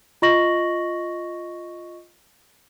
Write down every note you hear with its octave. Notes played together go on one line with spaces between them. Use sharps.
F4 D#5 C#6 A#6 F#7